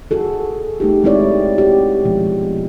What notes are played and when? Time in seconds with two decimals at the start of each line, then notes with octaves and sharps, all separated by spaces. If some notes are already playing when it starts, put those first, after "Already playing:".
0.11 F#4 G#4 A4
0.80 A3 D#4 G4
1.04 G#3 C4 E4 C#5 D5
1.58 F#4 G4
2.05 B2 F3 G#3